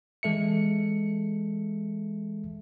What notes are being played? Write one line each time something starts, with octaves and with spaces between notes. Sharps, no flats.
E3 G#3 A4 E5 C#7